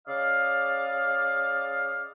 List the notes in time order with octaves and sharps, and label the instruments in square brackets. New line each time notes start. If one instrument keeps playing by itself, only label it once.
[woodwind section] C#3 D5 D#5 F5